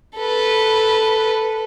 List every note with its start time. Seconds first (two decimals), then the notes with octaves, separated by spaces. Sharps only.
0.17 A4 B4